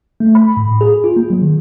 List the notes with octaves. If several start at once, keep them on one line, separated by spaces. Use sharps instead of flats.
A3
B5
A2
G#4
F4
A#3
F#3
D#3